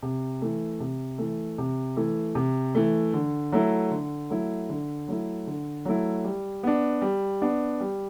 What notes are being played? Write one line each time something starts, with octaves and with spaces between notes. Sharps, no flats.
C3
E3 A3
C3
E3 A3
C3
E3 A3
C3
E3 A3
D3
F#3 A3 E4
D3
F#3 A3 E4
D3
F#3 A3 E4
D3
F#3 A3 E4
G3
B3 D4
G3
B3 D4
G3